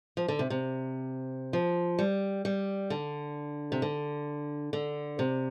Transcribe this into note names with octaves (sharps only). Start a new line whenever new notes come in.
F3
D3
C3
C3
F3
G3
G3
D3
C3
D3
D3
C3